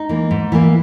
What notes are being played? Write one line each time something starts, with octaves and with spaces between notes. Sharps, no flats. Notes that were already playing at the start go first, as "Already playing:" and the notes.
Already playing: D#4
E3 A#3
G#2
E3 A#3